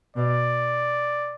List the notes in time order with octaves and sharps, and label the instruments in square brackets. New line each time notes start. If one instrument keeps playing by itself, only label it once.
[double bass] B2 [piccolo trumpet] D5